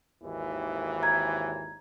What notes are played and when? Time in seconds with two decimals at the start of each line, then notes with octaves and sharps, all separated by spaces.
0.23 G#1 D#2 E3
1.03 A#5 G#6